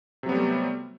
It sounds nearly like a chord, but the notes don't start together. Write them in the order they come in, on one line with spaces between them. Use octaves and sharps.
C3 F#3 B3 G3 A3